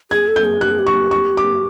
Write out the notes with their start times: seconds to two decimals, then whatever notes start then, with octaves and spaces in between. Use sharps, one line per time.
0.11 G#4 G#6
0.28 A4
0.36 G6
0.45 G#4
0.61 G4 F#6
0.71 G#4
0.79 G4
0.87 C#6
1.11 C#6
1.37 D6